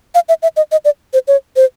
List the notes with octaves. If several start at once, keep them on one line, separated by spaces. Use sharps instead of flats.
F5
E5
E5
D#5
D#5
D5
C5
C#5
C5